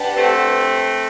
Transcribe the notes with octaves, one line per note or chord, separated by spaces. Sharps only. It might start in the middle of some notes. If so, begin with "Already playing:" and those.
Already playing: D4 G4 B4 F#5 A5
A3 C4